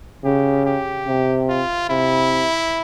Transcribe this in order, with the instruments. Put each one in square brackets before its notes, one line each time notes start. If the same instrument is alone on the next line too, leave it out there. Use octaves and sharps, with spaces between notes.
[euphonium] C#3 [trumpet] G4
[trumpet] G4
[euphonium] C3
[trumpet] F4
[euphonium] C3 [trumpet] E4